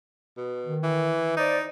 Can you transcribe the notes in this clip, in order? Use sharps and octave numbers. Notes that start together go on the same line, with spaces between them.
B2
D#3
E3
D#4 C5 D5